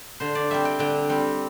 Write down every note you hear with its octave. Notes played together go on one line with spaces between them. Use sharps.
D3 C5
D5
G3 C4 E5
G5
D3 G5
G3 C4